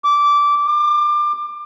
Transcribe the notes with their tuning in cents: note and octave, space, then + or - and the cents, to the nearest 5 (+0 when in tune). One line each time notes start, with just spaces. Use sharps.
D6 -15
D6 +25